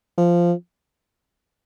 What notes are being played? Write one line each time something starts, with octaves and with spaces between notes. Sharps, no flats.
F3